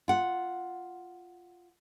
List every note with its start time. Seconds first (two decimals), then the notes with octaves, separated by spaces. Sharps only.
0.08 F4 F#5